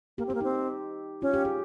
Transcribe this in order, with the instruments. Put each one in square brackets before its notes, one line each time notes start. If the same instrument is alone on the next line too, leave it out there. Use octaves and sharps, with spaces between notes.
[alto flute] A#3 [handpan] G4
[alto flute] C4
[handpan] G4
[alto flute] A#3
[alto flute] C4 [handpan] D#4
[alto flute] C#4 [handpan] F4
[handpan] G4
G#4